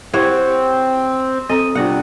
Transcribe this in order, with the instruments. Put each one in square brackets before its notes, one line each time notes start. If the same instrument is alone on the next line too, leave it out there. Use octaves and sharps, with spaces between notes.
[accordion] C4 [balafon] E4 G4 [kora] C#5 F#5
[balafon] C4 A4 A#5 [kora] D#5
[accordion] C3 G3 [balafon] B3 D4 F4 [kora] F#5